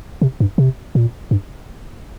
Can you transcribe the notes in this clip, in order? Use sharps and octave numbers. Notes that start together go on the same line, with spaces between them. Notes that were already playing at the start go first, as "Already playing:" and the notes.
C3
G2
C3
A#2
G2